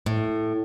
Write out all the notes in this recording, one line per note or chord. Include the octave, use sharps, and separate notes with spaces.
A2